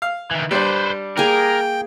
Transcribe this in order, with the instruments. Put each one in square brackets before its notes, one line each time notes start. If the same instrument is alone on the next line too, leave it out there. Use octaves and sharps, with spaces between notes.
[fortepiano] F5
[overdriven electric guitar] D#3 E3
[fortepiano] G3 D4 [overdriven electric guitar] B4 C5
[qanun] A#3 G#4 [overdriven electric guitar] A#4 [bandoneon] G5